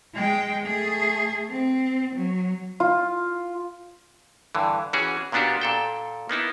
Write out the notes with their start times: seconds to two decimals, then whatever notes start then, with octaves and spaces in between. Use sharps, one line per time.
0.14 G#3 G5
0.66 A3 G#4
1.50 C4
2.15 F#3
2.80 F4
4.55 G2 D3 E3
4.93 E3 C#4 F#4 G#4
5.32 A#2 A#3 B3 D4 F#4 G4
5.61 A#2 A4 G5
6.29 A#3 B3 D#4 E4